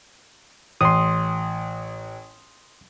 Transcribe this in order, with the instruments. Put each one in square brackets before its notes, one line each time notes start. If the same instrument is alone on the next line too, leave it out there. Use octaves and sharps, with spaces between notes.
[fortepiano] A1 [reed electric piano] C6 D#6